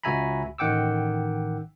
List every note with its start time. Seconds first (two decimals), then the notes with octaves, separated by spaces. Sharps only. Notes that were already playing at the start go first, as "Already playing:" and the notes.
0.03 C#2 F#4 E5 G#5 A#5 B5
0.58 A1 D#3 F#5 G5 D6 E6